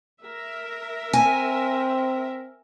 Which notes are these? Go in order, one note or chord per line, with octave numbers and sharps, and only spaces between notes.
A#4 E5
C4 G#5